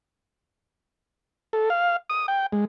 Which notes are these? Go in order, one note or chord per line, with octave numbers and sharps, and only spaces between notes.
A4
F5
D#6
G5
G#3